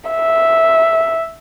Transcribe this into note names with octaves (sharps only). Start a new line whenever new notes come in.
E5